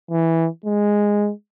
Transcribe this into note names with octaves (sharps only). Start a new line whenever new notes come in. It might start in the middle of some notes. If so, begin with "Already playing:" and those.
E3
G#3